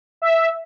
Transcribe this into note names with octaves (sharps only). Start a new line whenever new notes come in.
E5